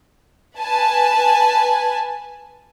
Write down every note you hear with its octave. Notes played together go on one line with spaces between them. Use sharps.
B4 G#5 A5